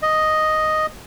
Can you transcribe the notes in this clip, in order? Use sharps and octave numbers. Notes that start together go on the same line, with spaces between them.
D#5